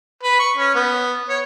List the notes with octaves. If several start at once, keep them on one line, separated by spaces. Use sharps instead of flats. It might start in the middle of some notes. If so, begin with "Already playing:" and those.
B4
C#6
C#4
B3
C#5